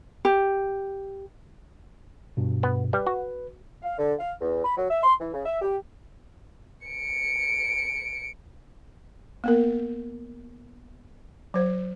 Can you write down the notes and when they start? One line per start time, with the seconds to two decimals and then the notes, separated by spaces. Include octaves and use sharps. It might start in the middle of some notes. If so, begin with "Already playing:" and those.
0.25 G4
2.37 G2 B2
2.63 B3
2.93 G3 B4
3.07 F#4
3.83 F5
3.98 D3
4.19 F5
4.40 E2
4.65 B5
4.77 F#3
4.90 E5
5.03 C6
5.20 E3
5.33 C#3
5.45 E5
5.62 G4
6.87 C#7 D7
9.44 A#3 B3 A#4
11.54 F#3 C5